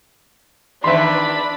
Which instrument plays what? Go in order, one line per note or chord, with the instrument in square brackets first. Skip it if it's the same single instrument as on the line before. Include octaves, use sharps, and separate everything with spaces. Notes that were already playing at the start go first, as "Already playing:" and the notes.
[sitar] E2 D#3 B4 [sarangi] D4 [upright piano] E5 C6 [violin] B5